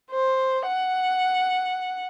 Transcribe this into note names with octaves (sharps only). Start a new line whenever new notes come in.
C5
F#5